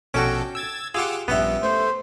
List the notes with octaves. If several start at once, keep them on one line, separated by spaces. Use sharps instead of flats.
A#1 B2 C#4 F#4 A4 G5 D6
E6 G#6 A6
F4 G4 G#4 F#5 C6 D6 E6
A#1 G2 B3 C#4 G4 E5
A3 C5